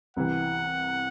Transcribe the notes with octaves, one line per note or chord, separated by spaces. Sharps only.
C2 C3 E3 F#5